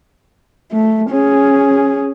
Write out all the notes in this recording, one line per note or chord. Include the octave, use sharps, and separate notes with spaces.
A3
C#4 G#4